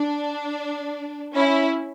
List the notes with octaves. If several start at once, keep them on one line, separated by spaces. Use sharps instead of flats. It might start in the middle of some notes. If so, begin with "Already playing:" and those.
Already playing: D4
C#4 E4